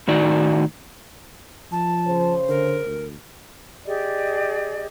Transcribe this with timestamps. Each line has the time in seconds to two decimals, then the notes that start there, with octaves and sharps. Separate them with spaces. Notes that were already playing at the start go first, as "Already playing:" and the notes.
0.08 A2 D#3 D#4 F#4 D5
1.72 F3 A5
2.08 C#3 C5
2.48 D3 A#4
2.85 D2
3.86 G4 G#4 D5 D#5